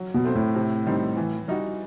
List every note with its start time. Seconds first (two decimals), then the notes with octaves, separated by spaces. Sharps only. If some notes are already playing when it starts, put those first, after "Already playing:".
Already playing: F#3
0.14 B2
0.24 A3 C4
0.35 A2
0.55 C3
0.86 D#3 G3 C4 D#4
1.17 E3
1.48 G3 D#4 F#4